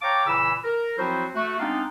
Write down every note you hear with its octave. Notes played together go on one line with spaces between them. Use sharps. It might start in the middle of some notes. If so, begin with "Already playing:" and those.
C#5 F5 G5 A5 A#5 D6
A#2 C#3 E3 E4 B5 E6
A#4
F3 F#3 C4 E4 F#4 C5
A3 F#4
G#3 B3 C4 D4 D#4 F5